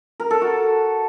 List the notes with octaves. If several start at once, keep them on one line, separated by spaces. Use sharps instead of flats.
A#4
A4
F#4